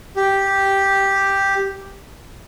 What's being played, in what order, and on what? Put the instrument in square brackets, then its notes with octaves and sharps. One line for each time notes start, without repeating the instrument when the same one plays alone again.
[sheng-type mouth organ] G4